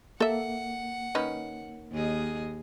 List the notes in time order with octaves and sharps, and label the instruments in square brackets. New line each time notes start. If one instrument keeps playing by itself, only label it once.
[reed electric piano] A#3 [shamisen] A4 E5 [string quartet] F#5
[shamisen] D#3 C#4 B4
[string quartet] D#2 G#4 D#5